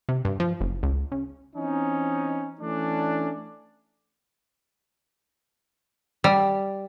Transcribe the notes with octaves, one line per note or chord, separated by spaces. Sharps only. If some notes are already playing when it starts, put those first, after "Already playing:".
C3
G2
F3
F#1
C#2
C#3
E3 C4 C#4 D#4
E3 A3 C#4 D4
G3